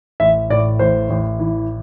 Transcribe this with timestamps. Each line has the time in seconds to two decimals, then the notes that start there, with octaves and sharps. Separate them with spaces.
0.20 A1 E5
0.50 A2 D5
0.79 A1 C5
1.10 A1
1.39 E3